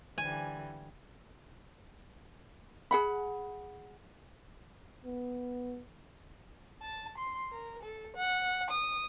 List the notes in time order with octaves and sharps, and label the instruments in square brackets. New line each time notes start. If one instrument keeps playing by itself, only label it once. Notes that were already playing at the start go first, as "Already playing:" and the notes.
[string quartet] D3 E3 G3 [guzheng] G#5
[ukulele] G#4 F#5 B5
[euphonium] B3
[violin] A5
C6
A#4
A4
F#5
D#6